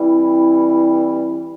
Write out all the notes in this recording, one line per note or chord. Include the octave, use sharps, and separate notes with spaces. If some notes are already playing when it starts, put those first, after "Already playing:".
Already playing: E3 G3 C4 E4